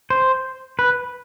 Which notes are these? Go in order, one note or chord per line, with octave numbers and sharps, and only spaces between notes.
C5
B4